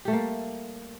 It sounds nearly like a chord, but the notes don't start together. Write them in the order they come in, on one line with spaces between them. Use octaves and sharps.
G4 A3 G3 A#3